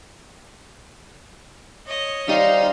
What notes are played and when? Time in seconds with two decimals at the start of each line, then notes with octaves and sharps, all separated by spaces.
1.87 C#5 D#5
2.29 G3 D#4 C5 F5